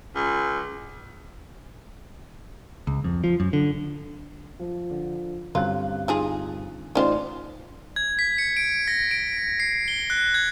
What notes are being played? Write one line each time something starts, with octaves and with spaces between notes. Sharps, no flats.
C#2
C#2
F2
F3
F#2
D3
F3
D3
G2 D3 F#3 C4 C#4 F4 F5 F#6
F3 D#4 G#4
A1 C#4 D#4 F4 C5 D5
G#6
B6
C#7
D7
A#6
D7
C7
G7
F#6
G#6